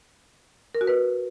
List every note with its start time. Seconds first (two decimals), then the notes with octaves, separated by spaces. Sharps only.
0.75 A#4
0.81 F#4
0.87 B4